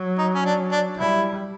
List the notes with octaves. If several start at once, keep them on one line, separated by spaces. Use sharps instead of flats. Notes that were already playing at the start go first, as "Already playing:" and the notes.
Already playing: F#3
D#4
C#4
D4
D4
G3 E4